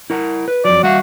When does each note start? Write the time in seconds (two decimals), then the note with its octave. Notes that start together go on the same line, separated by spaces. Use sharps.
0.10 E4 A#4 F#5
0.48 B4
0.65 F2 F#3 D5
0.83 G3 F#4 E5 F5